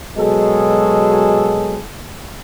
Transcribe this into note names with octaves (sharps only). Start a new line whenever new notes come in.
B2 F#3 G#3 G#4 A4